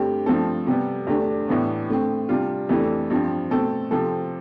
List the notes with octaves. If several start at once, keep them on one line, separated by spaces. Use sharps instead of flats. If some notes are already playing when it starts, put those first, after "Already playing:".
Already playing: G2 D3 A3 C4 G4
G2 F3 A3 C4 A4
C3 G3 B3
E2 D3 A3 D4 G4
A2 E3 B3 D4
D3 A3 C4
C3 G3 D4 F4
F2 E3 A3 D4 G4
G2 F3 C4
B2 A3 C4 A4
C3 F3 C4 A4